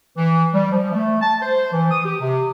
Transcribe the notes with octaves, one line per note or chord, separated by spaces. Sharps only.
E3
G3
F3
A3
A5
C5
E3
D#6
G4
C3